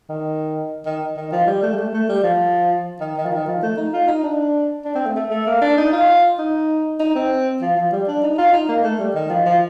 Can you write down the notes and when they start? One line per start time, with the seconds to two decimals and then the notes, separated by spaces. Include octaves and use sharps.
0.09 D#3
0.86 D#3
1.17 D#3
1.32 F3
1.47 G3
1.63 A3
1.73 G3
1.78 A3
1.94 A3
2.09 G3
2.24 F3
3.01 D#3
3.17 D#3
3.26 F3
3.32 D#3
3.48 F3
3.63 A3
3.77 D#4
3.93 F4
4.08 D#4
4.24 D4
4.85 D4
4.95 C4
5.06 A3
5.16 A3
5.31 A3
5.47 A#3
5.62 D4
5.77 D#4
5.93 F4
6.39 D#4
7.00 D#4
7.15 C4
7.62 F3
7.77 F3
7.92 G3
8.08 D4
8.23 D#4
8.38 F4
8.53 D#4
8.68 A#3
8.84 A3
8.99 G3
9.15 D#3
9.30 F3
9.46 F3